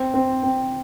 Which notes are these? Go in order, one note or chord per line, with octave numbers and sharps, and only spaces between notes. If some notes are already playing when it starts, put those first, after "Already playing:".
Already playing: C4
C4
C4